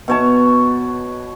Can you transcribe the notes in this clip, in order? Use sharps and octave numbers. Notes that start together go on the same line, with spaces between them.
B2 C#5 A5